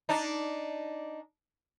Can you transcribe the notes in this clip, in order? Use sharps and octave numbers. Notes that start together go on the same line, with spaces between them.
D4 D#4